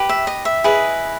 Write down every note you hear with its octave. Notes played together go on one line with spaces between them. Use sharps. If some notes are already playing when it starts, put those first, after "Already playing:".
Already playing: G4 B4
E5
D#5
E5
E4 G#4 B4 D#5